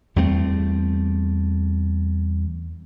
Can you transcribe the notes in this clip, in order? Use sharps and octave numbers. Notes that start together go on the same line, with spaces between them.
E2 G3 A3 C4